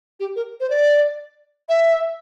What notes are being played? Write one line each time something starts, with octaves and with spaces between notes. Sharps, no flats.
G4
A#4
C5
D5
E5